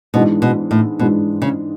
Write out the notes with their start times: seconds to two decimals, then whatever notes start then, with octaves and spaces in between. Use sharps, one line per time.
0.14 G#2 B2 E3 G#3 D4
0.42 B2
0.71 A2
0.99 G#2 B2 E3 G#3 D4
1.42 C#3